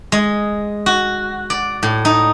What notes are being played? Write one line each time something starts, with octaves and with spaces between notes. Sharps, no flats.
G#3
F#4
D5
A2
D#4